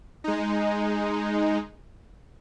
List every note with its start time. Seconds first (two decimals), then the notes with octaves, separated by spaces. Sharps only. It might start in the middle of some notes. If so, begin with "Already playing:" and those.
0.24 G#3 D#4